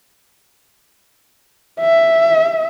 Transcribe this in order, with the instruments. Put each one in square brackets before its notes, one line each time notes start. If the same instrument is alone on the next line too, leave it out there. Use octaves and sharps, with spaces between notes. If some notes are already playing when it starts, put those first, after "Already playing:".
[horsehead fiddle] E5